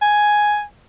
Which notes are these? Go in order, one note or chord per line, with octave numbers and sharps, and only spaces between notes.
G#5